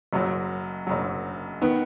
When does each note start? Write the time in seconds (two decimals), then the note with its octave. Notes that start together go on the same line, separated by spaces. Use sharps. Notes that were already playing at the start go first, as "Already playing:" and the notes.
0.13 F#1 F#2 F#3
0.87 F#1 F#2 F#3
1.62 D#3 B3